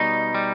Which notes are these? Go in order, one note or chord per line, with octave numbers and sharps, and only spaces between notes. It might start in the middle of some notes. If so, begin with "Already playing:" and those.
Already playing: B2 G3 D#4
G3